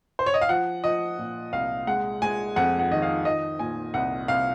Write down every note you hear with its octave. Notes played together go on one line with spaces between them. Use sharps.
C5
C#5
D#5
F5
F3 F#5
F3 D#5
A#2
C2 F5
G#3 F#5
G#3 G#5
F2 F#5
F#5
D#3 D#5
F5
F3 D#5
A#2 G#5
C2 F#5
C2 F5